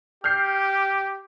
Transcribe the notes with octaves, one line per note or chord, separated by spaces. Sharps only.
G4 F6 G6 C7